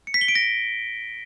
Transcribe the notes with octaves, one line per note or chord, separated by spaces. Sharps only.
C#7
B6
G7
D7
A#6